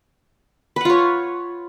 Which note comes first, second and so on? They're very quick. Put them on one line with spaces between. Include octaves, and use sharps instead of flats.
B4 F#5 F4 C#5